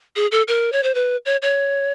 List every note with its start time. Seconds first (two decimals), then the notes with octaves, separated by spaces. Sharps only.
0.16 G#4
0.32 A4
0.48 A#4
0.72 C#5
0.83 C5
0.95 B4
1.26 C#5
1.42 C#5